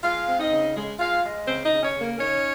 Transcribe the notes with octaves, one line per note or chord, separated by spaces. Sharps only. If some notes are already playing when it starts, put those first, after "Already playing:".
G#3 F4 F5
C4
D#4 D#5
C#3
G#3
G#3 F4 F5
G#3
C#3 C4 C5
D#4 D#5
C#3
C#4 C#5
C#3
A#3 A#4
C#4 D#4 C#5